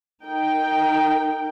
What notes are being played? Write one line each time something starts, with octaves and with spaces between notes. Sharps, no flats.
D#4 A#4 G5